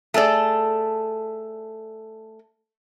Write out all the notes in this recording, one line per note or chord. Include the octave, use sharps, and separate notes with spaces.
A3 G#4 A4 D5